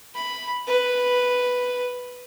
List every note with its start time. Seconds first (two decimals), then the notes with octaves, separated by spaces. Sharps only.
0.15 B5
0.67 B4